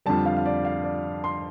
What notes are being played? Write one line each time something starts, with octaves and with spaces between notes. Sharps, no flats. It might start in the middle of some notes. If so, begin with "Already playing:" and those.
F2 D3 G3 A5
F5
F5
D5
F5
D5
C6